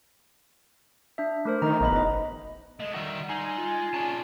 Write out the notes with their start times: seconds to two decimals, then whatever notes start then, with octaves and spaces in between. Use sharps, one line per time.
1.18 D4 E5
1.45 A3 A#4 C5
1.62 D#3 A#5
1.81 A#1 B3 D#5 B5
1.92 F#1 B4 D#5
2.80 G#3 A3 D#5
2.94 D#3 G3 F#4 E5
3.29 D#4 G#4 G#5 C6
3.58 F4
3.94 C#4 G#4 D5 A5